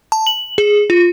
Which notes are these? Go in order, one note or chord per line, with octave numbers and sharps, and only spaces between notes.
A5
F#7
G#4
F4